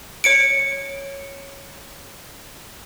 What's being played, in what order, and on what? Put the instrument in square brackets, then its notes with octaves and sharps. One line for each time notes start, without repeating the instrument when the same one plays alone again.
[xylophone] C#5 C#7 D7